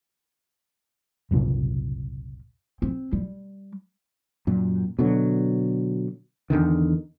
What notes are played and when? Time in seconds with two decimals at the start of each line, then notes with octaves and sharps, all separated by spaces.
1.31 F#1 C2 A#2 A#3
2.82 C4
3.13 G3
4.47 F#2 A#2
4.99 B2 D3 F#3
6.50 E2 B2 D3 D#3